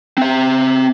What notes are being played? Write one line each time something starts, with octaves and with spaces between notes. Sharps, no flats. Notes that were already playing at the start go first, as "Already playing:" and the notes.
C4 E5